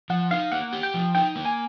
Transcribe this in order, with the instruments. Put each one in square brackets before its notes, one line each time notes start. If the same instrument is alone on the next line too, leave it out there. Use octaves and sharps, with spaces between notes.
[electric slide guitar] F3 [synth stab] F#5
[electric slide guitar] D#4 [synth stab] F5
[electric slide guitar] A#3 [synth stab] F#5
[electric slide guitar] G4
[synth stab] G5
[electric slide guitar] F3
[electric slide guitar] D#4 [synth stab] G5
[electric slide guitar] A#3
[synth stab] G#5